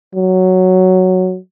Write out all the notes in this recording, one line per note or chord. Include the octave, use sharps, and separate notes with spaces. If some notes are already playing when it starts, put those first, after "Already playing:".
F#3